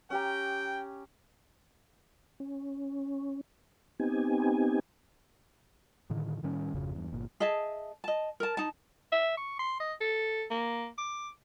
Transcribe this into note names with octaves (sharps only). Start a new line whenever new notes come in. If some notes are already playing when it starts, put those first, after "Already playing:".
C#4 G4 G5 A#5
C#4
B3 C4 D#4 G4 G#5
A2 D3 D#3
A2 D#3 G3 C#4
G#1 F2 C#3 F3
E2 G2
G1 A#2
G#4 D#5 E5 A5
D#5 A5
A#4 A5
D#4 A5
E5
C#6
C6
D#5
A4
A#3
D6